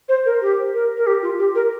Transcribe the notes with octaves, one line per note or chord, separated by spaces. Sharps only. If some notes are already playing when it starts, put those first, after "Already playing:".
C5
A#4
G4
A#4
A#4
G4
F4
G4
A#4